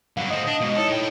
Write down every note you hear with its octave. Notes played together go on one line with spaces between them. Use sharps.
G2 F#3 F5 F#5
A2 C4 D#5 D#6
D4
G#2 B2
D#4 E4 A4 C#5
A2 G5